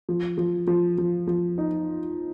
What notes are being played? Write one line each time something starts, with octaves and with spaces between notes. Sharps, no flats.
F3
F3
F3
F3
F3
D#4